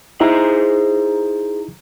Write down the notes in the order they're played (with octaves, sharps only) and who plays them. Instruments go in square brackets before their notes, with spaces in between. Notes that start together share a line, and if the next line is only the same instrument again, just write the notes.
[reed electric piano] D#4 E4 [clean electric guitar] G#4 C5 A#5